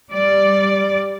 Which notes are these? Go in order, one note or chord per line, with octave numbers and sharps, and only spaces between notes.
G3 D5